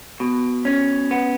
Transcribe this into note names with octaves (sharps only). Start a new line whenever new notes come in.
B2
C#4
B3